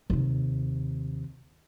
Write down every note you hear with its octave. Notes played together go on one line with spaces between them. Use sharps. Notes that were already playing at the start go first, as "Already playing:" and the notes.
D#2 C3